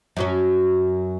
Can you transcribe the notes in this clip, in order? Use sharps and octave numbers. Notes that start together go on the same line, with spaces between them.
F#2 F#3 C#4